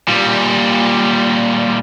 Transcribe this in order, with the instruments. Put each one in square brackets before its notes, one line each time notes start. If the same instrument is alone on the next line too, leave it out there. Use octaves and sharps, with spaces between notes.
[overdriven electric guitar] A#2 G3